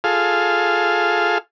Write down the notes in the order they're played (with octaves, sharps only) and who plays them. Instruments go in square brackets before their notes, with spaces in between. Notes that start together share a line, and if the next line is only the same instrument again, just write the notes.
[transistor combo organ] F4 G#4 A4 F5